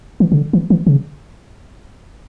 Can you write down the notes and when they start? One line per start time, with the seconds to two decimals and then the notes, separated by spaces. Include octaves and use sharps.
0.20 E3
0.32 C#3
0.37 D3
0.53 E3
0.70 E3
0.87 C#3